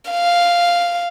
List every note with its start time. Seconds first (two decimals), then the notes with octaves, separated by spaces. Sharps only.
0.11 F5